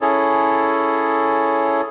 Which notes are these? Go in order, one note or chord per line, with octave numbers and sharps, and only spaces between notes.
C#4 E4 G#4 A4 C#5